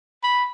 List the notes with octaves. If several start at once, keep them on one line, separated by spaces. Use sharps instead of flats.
B5